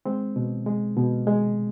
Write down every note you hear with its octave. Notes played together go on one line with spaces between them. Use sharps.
G#3 C4
B2
G#3
B2
G#3